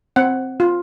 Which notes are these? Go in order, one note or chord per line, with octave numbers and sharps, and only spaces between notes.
C4 F#5
F4